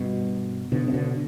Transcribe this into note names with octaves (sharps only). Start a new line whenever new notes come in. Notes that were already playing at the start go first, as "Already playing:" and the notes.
Already playing: G2 B2
B2 D3
C3
B2 D3